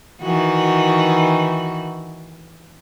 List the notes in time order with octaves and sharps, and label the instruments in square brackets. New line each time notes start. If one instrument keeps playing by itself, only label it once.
[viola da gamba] D#3 E3 F#4